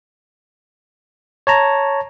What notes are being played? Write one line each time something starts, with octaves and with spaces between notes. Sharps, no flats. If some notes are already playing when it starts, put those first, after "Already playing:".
C#5 A5 A#5